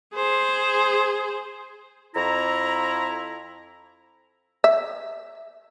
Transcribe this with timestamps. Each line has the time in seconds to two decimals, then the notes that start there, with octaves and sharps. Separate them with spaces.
0.15 G#4 C5
2.15 F2 E4 A#5
4.64 E5